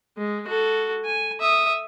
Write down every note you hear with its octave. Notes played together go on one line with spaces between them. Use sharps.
G#3
F#4 A4
G#5
E5 D#6